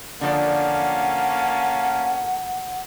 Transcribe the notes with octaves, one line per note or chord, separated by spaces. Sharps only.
D3 F3 A#3 C#4 D5 F#5 A5